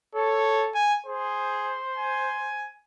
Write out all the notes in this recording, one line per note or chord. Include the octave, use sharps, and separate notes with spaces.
A4 C#5
G#5
G#4 C5
G#5